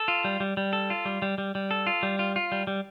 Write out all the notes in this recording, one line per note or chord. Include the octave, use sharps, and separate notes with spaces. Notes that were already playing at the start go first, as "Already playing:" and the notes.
Already playing: A4
F4
G3
G3
G3
A4
F4
G3
G3
G3
G3
A4
F4
G3
F4
F4
G3
G3